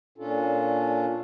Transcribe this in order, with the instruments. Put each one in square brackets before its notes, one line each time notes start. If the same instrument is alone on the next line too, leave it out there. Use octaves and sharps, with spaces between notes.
[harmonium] A#2 C#4 D4 F4 A4